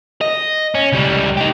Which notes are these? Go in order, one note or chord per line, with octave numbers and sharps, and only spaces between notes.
D#5
C#4
C#2 G3
D#4 G4